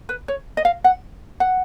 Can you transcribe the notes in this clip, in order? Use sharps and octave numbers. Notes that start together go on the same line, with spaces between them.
B4
C#5
D#5
F5
F#5
F#5